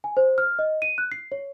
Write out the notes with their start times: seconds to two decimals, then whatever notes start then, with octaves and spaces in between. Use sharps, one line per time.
0.04 G#5
0.17 C5
0.38 F6
0.59 D#5
0.82 D#7
0.98 F#6
1.12 C7
1.32 C#5